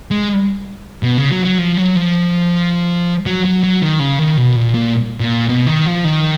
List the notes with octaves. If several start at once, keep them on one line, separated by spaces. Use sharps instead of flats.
G#3
B2
C#3
F#3
F#3
F3
F#3
F3
F#3
F#3
F#3
D#3
C#3
D#3
B2
A#2
A#2
A#2
B2
D#3
F3
D#3